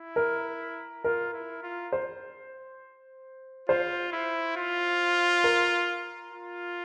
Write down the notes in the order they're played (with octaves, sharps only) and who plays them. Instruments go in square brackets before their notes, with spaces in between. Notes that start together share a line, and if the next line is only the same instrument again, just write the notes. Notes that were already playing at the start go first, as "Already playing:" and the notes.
Already playing: [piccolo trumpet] E4
[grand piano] A#4
[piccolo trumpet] F4 [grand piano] A#4
[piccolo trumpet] E4
F4
[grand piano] C5
[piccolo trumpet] F4 [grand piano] C5
[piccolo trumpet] E4
F4
[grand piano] A#4
[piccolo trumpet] F4